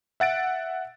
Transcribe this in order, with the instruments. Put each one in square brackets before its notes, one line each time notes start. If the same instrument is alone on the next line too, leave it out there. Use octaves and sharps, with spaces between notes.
[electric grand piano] E5 F#5 A6 D7